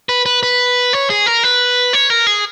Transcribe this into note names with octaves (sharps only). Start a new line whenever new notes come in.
B4
B4
B4
C#5
G#4
A#4
B4
C#5
A#4
G#4